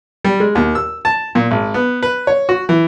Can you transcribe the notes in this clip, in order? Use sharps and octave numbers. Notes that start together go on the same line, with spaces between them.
G3
G#3
D#2
E6
A5
A#2
G#1
B3
B4
C#5
F#4
E3